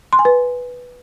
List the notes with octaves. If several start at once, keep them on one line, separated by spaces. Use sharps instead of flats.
C6
G#5
B4